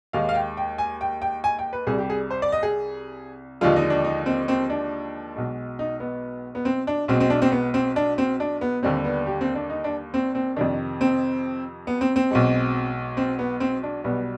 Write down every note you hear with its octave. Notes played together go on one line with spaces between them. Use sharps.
D#2 D#3 G#3 F5
F5
G5
G5
G#5
G5
G5
G#5
G5
B4
C2 C3 G3 G#4
G4
G#4
C5
D5
D#5
G#4
D#2 D3 F3 G#3 F4
D#4
D4
D#4
C4
C4
D4
B1 B2 G#3
D#4
B3
B3
C4
D4
B1 B2 G#3 C4
C4
D4
C4
B3
C4
D4
C4
D4
B3
D#2 D3 G3 C4
B3
G4
C4
D4
D#4
D4
C4
C4
F2 C3 D#3 D4
C4
B3
C4
C4
B1 B2 G#3
C4
B3
C4
D4
B1 B2 G3 B3